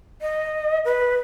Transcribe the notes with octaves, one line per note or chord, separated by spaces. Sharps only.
D#5
B4